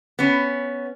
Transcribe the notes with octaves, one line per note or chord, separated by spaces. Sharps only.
B3 C#4